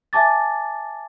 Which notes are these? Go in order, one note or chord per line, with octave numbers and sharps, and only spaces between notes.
E5 G#5 A5 D6 A6